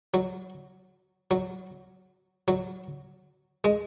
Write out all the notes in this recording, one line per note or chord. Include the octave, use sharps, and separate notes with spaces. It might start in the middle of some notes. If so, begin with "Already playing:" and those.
F#3
F#3
F#3
G#3